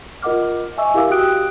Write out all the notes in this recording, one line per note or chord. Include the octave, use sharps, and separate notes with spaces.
F4 A#4 D#5 F#5 D6 F6
D#5 E5 G#5 C#6 E6
E4 G4 A#4 F5 D6 E6
F#4 G4 G5 D#6 F#6 D7